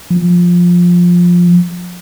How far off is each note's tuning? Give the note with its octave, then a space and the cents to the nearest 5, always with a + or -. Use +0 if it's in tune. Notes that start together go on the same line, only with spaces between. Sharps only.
F3 +10